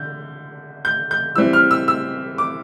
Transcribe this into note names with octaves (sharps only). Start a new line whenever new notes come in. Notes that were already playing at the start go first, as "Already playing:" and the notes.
Already playing: D3 G6
G6
G6
E3 G3 C4 E4 E6
F6
E6
E6
D6